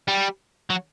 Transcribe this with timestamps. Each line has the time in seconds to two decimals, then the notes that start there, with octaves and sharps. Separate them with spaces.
0.08 G3
0.70 F#3